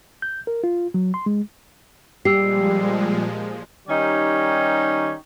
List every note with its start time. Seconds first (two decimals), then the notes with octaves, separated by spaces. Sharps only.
0.22 G6
0.47 A#4
0.64 F4
0.94 F#3
1.14 C6
1.26 G#3
2.25 A#2 F3 G3 G#3 G4 E6 C7
3.88 D#3 G3 C#4 D#4 G4 C#5